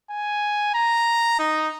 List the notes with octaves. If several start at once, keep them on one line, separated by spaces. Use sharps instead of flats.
G#5
A#5
D#4